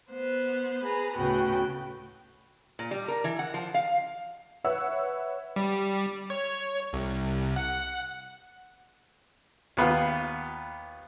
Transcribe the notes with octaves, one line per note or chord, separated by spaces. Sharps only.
B3 C5
G#4 B4 A#5
D2 A2 C#3 B3 F#4 G5
A#2
G3
A#4
E3
F#5
F3
F5
B4 C#5 E5 F#5 E6
G3
C#5
C2
F#5
D#2 B3 F4 B4